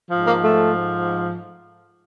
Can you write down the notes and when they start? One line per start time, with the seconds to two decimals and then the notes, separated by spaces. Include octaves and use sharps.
0.09 G#2 F3
0.26 A#3
0.43 A3